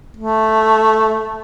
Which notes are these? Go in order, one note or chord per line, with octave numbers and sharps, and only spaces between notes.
A3